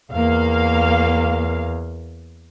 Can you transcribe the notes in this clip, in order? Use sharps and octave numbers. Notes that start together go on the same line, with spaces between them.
E2 A#3 F5